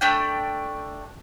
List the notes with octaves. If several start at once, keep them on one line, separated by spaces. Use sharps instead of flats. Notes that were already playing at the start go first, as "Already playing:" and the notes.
A3 D4 G5